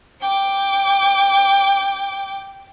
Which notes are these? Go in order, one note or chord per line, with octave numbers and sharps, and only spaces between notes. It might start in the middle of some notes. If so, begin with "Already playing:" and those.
G5 D6